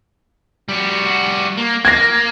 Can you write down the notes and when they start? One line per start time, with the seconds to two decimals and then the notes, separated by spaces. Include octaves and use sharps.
0.69 G3 F#4
1.58 A#3
1.85 A#3 G#6 A#6